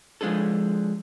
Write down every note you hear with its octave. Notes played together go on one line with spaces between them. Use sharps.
F3 G#3 D4 G#4 A4